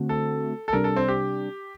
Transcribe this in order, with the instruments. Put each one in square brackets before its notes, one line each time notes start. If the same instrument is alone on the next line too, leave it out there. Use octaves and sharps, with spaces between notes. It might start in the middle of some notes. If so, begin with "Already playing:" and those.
Already playing: [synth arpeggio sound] D3 A3 C4 F#4
[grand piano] A4
A4
[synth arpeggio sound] C3 G3 D4 [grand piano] A#4
[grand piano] A4
C4
G4